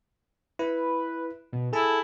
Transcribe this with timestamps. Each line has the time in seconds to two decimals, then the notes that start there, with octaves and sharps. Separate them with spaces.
0.59 E4 B4
1.53 B2
1.73 E4 G#4 A4 G#5 A5